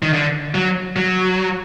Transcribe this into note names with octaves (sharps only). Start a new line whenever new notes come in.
D#3
D3
F#3
F#3